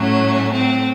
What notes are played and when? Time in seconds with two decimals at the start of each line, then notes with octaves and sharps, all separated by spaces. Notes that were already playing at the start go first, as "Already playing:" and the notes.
Already playing: A2 F#3 A3 C#4
0.52 C4